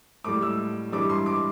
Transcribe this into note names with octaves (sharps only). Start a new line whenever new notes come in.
A2 G3 D6
E6
G2 E3 G3 D6
C6
D6